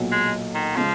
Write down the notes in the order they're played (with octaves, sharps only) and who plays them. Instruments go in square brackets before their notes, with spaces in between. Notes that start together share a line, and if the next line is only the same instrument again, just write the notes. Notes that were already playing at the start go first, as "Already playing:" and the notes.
Already playing: [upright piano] B1 A#2 F#3
[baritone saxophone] G#3
D#3
[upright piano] C#3 G#3 [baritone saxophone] F3